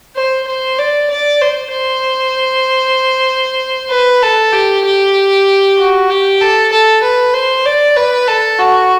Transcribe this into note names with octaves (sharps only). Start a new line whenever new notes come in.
C5
C5
D5
D5
C5
C5
B4
A4
G4
G4
F#4
G4
A4
A4
B4
C5
D5
B4
A4
F#4